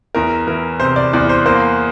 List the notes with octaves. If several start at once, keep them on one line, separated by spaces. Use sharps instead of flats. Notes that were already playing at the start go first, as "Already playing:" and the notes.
E2 A#4
E3 A#4
C3 C5
D5
E2 D5
C5
A#3 C5